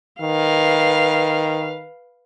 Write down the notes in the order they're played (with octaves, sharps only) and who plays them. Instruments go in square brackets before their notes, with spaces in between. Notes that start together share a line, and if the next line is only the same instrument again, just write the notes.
[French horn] D#3 [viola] B4 F5